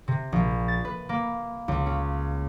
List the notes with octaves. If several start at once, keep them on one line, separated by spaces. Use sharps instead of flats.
C3
A#1
A6
B4
A#3
C#2
C#4